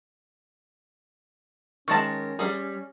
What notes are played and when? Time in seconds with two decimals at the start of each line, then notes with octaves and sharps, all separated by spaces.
1.88 D#3 G#3 C#4 A5 C#6 A6 A#6
2.39 G3 G#4